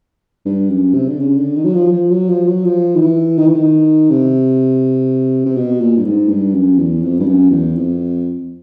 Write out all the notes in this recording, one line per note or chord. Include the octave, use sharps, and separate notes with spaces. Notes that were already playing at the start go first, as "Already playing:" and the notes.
G2
F#2
C3
D3
C#3
D3
D#3
F#3
F3
F3
F#3
F3
F#3
F3
D#3
E3
D#3
E3
D#3
C3
C3
B2
A#2
G2
G#2
G2
F#2
E2
F2
G2
F#2
E2
F2